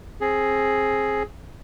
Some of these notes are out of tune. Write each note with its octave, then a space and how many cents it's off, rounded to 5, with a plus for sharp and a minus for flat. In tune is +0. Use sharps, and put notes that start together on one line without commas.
C4 +25 G#4 +10